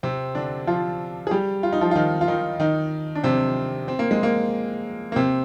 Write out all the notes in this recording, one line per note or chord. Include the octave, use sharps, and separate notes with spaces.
C3 C4
D3 D4
F3 F4
G#4
G3 G4
F4
D#4
F3 F4
F4
D#3 D#4
F4
D#3 D#4
D#3 D#4
D4
C3 C4
C4
A#3
G#3
A#3
A#3
C3 C4